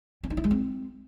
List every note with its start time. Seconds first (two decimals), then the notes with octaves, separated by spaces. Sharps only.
0.23 C#4
0.30 D#4
0.37 E4
0.44 G#3
0.51 C4